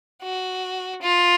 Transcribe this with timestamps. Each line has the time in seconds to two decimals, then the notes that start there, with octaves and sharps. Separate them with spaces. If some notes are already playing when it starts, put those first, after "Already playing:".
0.23 F#4
1.01 F4